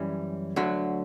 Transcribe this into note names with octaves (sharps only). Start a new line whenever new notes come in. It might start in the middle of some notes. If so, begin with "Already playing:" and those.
Already playing: F#2 E3 G3 C#4
D2 D3 F#3